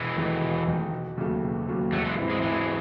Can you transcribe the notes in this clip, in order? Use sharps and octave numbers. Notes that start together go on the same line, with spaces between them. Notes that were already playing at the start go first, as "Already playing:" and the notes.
Already playing: E1 E3 G#3
E2 D#3 A3 D#4
E1
E2 D#3 A3 D#4
E1
D#2 C#3 F#3 A3
E1
D#2 C#3 F#3 A3
A1 F#3 A3
E3 G#3
G#2 E3 C4 E4
E3 G#3
A1 E3 G#3